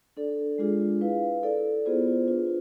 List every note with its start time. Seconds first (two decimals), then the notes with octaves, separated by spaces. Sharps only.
0.17 D4 A4 D5
0.58 G#3 D4 F4 G#4
1.01 E4 B4 F5
1.43 E4 A4 D5
1.86 B3 F4 G#4 C5
2.28 D4 F4 B4